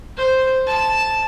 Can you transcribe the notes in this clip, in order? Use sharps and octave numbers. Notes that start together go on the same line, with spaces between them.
C5
A5